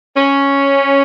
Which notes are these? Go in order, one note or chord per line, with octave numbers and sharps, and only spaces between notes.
C#4